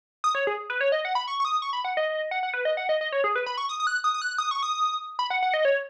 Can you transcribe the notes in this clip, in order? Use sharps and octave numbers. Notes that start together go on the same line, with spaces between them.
D#6
C#5
G#4
B4
C#5
D#5
F#5
B5
C#6
C#6
D#6
C#6
B5
F#5
D#5
F#5
F#5
B4
D#5
F#5
D#5
D#5
C#5
G#4
B4
B5
C#6
D#6
D#6
F#6
D#6
D#6
F#6
D#6
C#6
D#6
B5
F#5
F#5
D#5
C#5